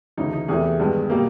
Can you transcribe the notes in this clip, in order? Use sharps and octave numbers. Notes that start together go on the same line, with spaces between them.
D2 C#3 E3 D#4
D#4
E2 C3 E3 A3 G#4
G2 D#3 G#3 B3
B2 G3 A#3